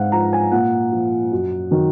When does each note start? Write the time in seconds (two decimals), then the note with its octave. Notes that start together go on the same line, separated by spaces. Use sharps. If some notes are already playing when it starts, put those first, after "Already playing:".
Already playing: G#2 F5 F#5
0.12 F3 A#5
0.33 G#5
0.52 A#2 F#5
0.92 F3
1.32 F#2
1.71 D#3 F#3